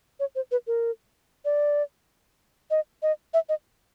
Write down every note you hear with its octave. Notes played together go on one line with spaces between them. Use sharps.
C#5
C5
B4
A#4
D5
D#5
D#5
E5
D#5